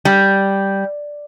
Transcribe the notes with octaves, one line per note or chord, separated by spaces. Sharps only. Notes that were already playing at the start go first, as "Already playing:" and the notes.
G3